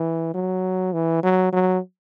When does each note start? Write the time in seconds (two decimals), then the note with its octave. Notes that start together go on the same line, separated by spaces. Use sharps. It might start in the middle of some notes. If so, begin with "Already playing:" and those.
Already playing: E3
0.34 F#3
0.93 E3
1.23 F#3
1.53 F#3